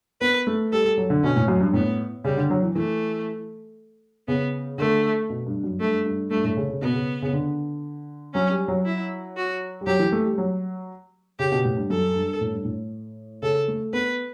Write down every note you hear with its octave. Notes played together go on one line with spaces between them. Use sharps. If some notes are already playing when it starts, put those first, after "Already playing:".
B3 B4
A3
G3 A4
G3
F#3
D3
B2 C#4
A2
F#2
G2
A2 B3
C#3 G3
D3
F#3
E3
E3 A3
C#3 B3
D3 A3
B2
G2
F#2
G2 A3
G2
G2 A3
A2
C#3
C#3
B2 B3
C#3
C#3
D3
F#3 C#4
G3
F#3
E4
F#4
G3
F#3 G4
E3
A3
G3
F#3
C#3 G4
B2
A2
G2
F#2 A4
G2
A2
G2
A2
C#3 A4
A3
B3 B4